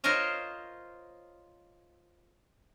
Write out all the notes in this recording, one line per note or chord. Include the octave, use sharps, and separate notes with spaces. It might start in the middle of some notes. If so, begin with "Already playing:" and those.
F4 A#4 C5 C#5 D#5 F5